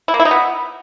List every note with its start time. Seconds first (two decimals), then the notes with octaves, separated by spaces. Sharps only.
0.08 E4
0.14 A#3
0.20 E4
0.25 D#4
0.31 B3